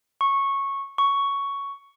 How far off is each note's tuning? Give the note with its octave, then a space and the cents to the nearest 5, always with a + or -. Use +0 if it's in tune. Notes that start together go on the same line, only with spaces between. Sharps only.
C#6 -10
C#6 +10